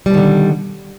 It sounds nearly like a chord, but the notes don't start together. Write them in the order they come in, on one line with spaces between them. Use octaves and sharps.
G3 B2 D#3 D3